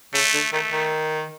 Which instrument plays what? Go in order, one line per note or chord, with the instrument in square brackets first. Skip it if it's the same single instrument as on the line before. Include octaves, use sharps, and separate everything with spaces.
[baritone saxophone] C#3 [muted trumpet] A3
[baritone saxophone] D3
[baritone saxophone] D#3 [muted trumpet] A3
[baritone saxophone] D#3